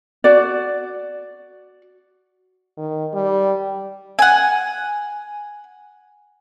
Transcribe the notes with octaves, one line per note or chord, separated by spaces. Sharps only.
F#4 D5
D#3
G3
F#5 G#5